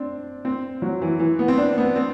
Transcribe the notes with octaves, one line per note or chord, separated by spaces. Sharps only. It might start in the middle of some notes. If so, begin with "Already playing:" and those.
Already playing: C4 D4
C4
F#3
E3
E3
B3
C4
D4
B3
C4